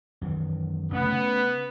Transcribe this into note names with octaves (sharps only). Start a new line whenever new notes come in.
F#2 D#3 E3
C#3 A3 B3 C#4